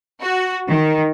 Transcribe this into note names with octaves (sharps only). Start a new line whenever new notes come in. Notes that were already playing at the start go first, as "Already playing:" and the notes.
F#4
D#3